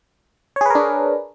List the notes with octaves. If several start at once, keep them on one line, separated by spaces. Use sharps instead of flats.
D4 G#4 A#4 B4 C#5